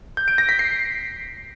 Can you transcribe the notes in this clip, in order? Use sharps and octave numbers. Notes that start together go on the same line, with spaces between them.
G6
D7
A#6
B6
C7